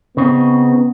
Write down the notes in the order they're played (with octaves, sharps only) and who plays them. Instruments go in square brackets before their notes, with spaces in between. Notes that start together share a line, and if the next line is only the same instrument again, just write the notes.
[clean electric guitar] C#3 C4 D#4 [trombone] B3